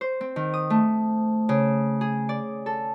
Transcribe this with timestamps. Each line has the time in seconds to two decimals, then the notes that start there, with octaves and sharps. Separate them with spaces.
0.01 C5
0.21 C4
0.36 D#3
0.54 D#6
0.70 A3
1.49 C#3
2.01 G#4
2.29 D5
2.66 A4